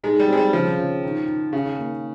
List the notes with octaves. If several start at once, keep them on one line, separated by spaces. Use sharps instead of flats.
G#3 D#4
G3
G#3 C4
G3
C#3 F3
C#3
D#3
D#3
C#3 D#4
A#3